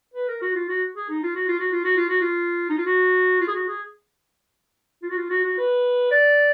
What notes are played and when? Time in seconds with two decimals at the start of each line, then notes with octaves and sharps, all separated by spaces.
0.14 B4
0.28 A#4
0.42 F#4
0.55 F4
0.69 F#4
0.96 G#4
1.09 D#4
1.23 F4
1.35 F#4
1.48 F4
1.60 F#4
1.72 F4
1.84 F#4
1.97 F4
2.08 F#4
2.21 F4
2.70 D#4
2.78 F4
2.86 F#4
3.41 F4
3.47 G#4
3.54 F#4
3.68 G#4
5.03 F4
5.10 F#4
5.17 F4
5.30 F#4
5.44 F#4
5.58 B4
6.11 D5